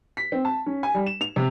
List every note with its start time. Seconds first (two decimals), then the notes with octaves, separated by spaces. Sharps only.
0.17 B6
0.32 C4
0.45 A5
0.66 C#4
0.83 G#5
0.94 G3
1.06 E7
1.21 F7
1.36 C3